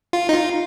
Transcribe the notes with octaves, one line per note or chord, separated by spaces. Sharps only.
F4
D#4
F4